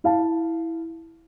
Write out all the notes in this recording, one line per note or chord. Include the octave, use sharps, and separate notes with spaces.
E4 F5 A5